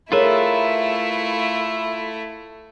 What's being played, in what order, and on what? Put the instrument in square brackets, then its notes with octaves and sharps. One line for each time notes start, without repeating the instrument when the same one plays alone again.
[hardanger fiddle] A3 E4 [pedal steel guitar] F4 B4 E5 [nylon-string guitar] G#4 A#4 C#5